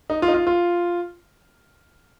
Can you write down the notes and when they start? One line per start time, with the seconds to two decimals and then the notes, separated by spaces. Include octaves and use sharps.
0.10 D#4
0.22 F4
0.28 D#4
0.34 F4
0.47 F4